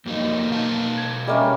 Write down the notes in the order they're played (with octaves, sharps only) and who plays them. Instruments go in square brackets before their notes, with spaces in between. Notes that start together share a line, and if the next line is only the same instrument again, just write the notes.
[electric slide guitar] F2 F#3 D#4 [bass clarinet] A#3
[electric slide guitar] B2 F5 A5
[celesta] G#6
[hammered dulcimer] G3 A#3 C#4 [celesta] G#4 D#5 E5